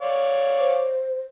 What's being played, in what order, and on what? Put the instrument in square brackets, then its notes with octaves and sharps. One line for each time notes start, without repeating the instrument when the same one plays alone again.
[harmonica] C#5 D5 F5
[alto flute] C5